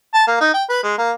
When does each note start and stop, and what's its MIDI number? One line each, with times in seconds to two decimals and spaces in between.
0.14 0.26 81
0.27 0.39 58
0.41 0.53 63
0.54 0.64 79
0.70 0.81 71
0.83 0.95 56
0.98 1.12 58